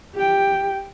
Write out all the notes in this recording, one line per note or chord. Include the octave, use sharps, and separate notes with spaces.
G4 G5